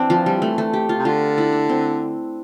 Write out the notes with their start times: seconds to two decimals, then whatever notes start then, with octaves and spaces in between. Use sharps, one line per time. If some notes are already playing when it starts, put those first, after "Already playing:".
Already playing: E3 C4 D4
0.10 F3
0.26 G3
0.42 A3
0.58 A3
0.73 G4
0.89 F4
0.98 C3
1.05 D3 F4
1.38 E4
1.52 D4
1.69 C4